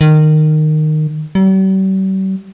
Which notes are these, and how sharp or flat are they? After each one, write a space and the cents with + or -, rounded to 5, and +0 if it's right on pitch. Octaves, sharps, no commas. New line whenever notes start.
D#3 -15
G3 -45